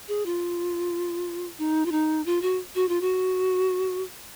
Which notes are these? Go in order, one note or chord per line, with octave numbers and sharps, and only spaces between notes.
G#4
F4
D#4
F4
D#4
F4
F#4
F#4
F4
F#4